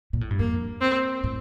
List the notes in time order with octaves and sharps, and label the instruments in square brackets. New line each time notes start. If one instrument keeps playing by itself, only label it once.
[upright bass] A#2
A2
G2
[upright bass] F2 [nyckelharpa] A#3
[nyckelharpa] C4
[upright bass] A2